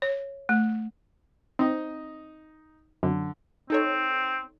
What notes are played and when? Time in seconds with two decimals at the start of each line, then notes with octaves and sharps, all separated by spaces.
0.02 C#5
0.49 A3
1.59 C4 D#4 D#5
3.03 F#2 D3
3.70 C4 D#4 A4 C#5